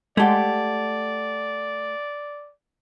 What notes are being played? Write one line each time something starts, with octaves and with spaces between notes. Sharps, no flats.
G#3 A3 G4 D5 F#5 A5 G#6